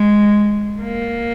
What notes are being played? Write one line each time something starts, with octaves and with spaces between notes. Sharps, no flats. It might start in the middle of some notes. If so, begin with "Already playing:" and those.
Already playing: G#3
A#3